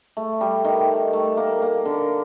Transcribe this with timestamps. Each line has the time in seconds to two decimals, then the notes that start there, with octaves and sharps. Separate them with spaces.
0.17 A3
0.41 G3
0.65 D#3
1.13 A3
1.37 A#3
1.62 A#3
1.86 D3